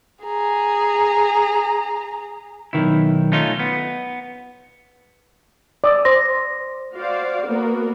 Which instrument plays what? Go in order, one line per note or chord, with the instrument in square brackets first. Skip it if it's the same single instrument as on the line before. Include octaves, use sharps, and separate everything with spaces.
[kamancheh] G#4 A#5
[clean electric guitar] B1 F2 D#3 E4
A3 C#4 D#4 F4
B3
[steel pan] D5 D#6 E6
[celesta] C5 C6 A#6
[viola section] F#4 C5 D5 F5
A#3 B3 F#4 A#4